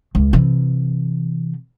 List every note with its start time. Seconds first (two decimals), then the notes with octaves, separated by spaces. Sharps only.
0.15 C#2
0.33 C3 E3